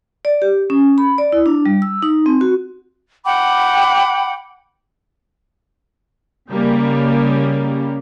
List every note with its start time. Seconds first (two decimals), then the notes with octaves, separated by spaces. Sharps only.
0.25 D5
0.42 G4
0.70 C#4
0.98 B5
1.18 D5
1.32 E4
1.46 D4
1.66 G3
1.82 E6
2.02 D#4
2.26 C4
2.41 F#4
3.25 F#5 G5 B5 D6
6.50 C#3 G3 A#3 C#4